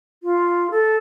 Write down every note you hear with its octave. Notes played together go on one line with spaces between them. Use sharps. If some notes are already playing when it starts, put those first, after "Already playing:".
F4
A4